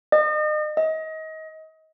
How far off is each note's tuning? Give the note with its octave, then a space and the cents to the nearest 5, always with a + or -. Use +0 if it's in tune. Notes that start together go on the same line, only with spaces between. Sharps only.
D#5 -35
D#5 +30